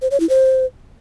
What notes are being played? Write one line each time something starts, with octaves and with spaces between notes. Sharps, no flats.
C5
C#5
E4
C5